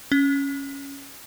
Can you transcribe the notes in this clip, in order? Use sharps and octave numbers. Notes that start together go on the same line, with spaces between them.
C#4